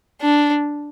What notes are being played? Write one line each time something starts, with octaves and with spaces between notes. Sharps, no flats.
D4